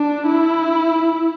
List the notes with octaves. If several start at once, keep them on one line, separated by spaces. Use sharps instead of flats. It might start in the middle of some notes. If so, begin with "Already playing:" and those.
Already playing: D4
E4